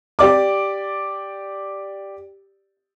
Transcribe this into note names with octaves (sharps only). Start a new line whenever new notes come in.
G4 D5 D6